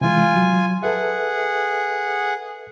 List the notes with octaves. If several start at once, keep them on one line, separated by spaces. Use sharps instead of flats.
C3 E3 G#3 F4 G#5
F#3
G#4 A4 B4 E5 F#5